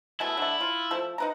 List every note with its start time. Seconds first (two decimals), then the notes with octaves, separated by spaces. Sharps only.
0.20 B2 G#3 A3 E4
0.37 D3 A3
0.60 F4
0.91 F3 A3
1.18 D#4 B4 A#5